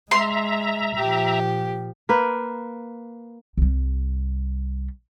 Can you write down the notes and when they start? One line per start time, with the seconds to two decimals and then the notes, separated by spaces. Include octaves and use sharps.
0.11 G#3 E5 A#5 C6
0.98 A#2 F3 G4
2.09 A#3 B4
3.57 C2 G3